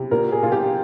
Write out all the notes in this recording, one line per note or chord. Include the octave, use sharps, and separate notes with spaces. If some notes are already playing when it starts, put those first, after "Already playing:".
Already playing: C3
A#2 A#4
G#4
A#2 F4
G4